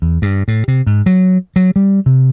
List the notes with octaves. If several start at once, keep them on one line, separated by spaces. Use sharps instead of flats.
E2
G2
A2
C3
G#2
F#3
F#3
G3
C3